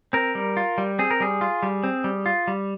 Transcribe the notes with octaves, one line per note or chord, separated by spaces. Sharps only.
C4 A#4
G3
F4
G3
C4 G#4
A#4
G3 G#4
F4
G3
C4
G3
F4
G3